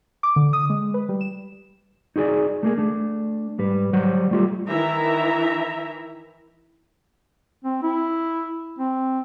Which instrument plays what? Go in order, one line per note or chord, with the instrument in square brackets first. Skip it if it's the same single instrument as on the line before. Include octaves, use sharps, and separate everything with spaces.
[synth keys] D6
D3
D#6
G#3
B4
G3
E7
[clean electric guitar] D#4 F#4 G#4 D5 G#5
A3 A#3 G#4
A3 D4
G#2 G3 B4
F#3 G3 C5 F#5
G3 A3 F4 G4 A4
[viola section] D#3 E3 E4 E5 A#5
[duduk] C4
E4
C4